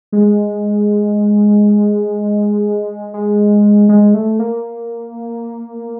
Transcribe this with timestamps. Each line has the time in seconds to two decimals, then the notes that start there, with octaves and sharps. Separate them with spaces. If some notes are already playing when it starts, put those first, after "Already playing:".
0.12 G#3
3.14 G#3
3.89 G#3
4.14 A3
4.39 A#3